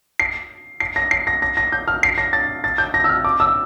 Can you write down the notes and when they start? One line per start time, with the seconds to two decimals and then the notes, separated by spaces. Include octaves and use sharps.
0.20 C7
0.80 C7
0.96 A#6
1.11 C7
1.27 A#6
1.42 A#6
1.57 A#6
1.72 G6
1.88 F6
2.03 C7
2.18 A#6
2.33 A6
2.64 A6
2.78 G6
2.94 A#6
3.04 E6
3.09 F6
3.25 D6
3.40 E6